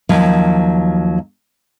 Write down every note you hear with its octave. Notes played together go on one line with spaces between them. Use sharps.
D#2 F3 F#3